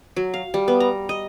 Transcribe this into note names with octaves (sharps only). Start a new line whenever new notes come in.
F#3
F5
G3
B3
A#5
D#5